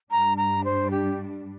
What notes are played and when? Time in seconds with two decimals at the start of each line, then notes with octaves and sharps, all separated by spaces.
0.11 G2 G3 D4 A#5
0.37 A#5
0.64 C5
0.91 G4